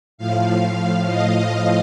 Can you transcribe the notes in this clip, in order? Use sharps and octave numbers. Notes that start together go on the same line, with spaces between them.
A2 F3 F5
F5
F5
D#5
D#5